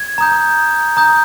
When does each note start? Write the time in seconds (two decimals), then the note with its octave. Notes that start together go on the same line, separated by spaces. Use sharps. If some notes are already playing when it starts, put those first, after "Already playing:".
Already playing: G#6
0.18 A#5 D#6 G6
0.97 A#5 D#6 G6